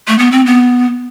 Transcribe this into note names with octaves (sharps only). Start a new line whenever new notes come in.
A3
B3
C4
B3